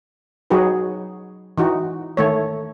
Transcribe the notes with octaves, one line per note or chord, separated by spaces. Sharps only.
F#3 D#4 F#4 G#4 B4
E3 D#4 F#4
D#3 A3 C#5